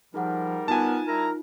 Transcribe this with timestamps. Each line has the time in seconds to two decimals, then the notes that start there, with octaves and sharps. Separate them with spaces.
0.14 F3 G3 D#4 G#4 A#4 F#5
0.68 B3 D#4 F4 G#5 A5
1.07 G3 E4 A#4 A#5